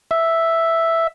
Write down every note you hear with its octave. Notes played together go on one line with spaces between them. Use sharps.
E5